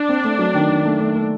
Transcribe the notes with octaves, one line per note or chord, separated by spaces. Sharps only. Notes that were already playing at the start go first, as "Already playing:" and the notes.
Already playing: D4
C4
A3
F#3
D#3
D#3
A3
A3
A3